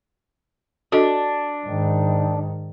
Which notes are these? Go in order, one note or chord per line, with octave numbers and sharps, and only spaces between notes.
D4 F#4 A4 D#5
G#2 D#3